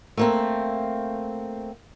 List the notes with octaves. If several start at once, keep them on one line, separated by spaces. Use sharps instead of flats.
A3 A#3 C4